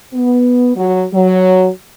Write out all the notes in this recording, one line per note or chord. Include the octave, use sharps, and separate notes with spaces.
B3
F#3
F#3